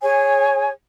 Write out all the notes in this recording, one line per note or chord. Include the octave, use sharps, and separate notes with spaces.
G#4 C#5 G#5